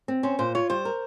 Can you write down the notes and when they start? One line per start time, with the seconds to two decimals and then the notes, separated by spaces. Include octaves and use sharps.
0.08 C4
0.23 C#4 C5
0.39 A#2 C5
0.55 F4 C#5
0.70 G3 C5
0.85 A#4